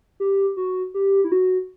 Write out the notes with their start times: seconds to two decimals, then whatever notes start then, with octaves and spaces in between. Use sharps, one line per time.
0.20 G4
0.57 F#4
0.94 G4
1.24 E4
1.32 F#4